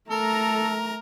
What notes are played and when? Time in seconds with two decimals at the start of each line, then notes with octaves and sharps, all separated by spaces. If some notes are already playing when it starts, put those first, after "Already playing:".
0.10 A3 A4 A#4 A#5